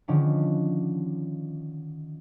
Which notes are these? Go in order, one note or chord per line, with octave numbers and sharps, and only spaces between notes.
D3 D#3 F3 C#4 D4